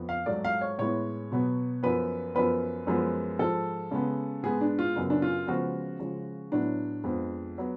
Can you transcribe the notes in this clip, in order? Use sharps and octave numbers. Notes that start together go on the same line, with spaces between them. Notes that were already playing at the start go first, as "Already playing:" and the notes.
Already playing: F2 F3 B3
F5
G#2 F#3 A3 D5
F5
C#5
A2 G#3 B3 C#5
B2 F#3 B3
F#2 F3 B3 B4
F#2 F3 B3 B4
F#2 F3 G#3 B3
G#2 F3 G#3 A4
C#3 G#3 B3
G#2 G#3 B3 G#4
D4
F4
F#2 C#3 F#3 B3
D4
F4
C#3 F3 G#3 B3 F#4
C#3 F3 G#3
A2 F#3 B3 D4
F2 F3 G#3 B3
F#3 B3